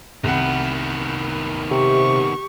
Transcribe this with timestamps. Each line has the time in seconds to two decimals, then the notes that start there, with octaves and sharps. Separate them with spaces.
0.24 C2 D#3 B3 F#5
1.71 C3 G4 C#6